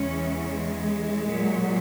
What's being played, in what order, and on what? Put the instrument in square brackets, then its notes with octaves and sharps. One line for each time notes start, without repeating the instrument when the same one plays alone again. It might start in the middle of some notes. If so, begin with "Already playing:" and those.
Already playing: [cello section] E2 C#3 E3 G#3 C#4
G#3
A#2 F#3